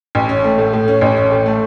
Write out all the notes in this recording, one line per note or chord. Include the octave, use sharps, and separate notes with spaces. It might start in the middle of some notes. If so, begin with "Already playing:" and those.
A1
C#4
A3
A2
A2
C#4
A1
C#4
A2
A3